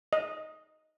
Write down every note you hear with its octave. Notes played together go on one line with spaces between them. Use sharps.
D#5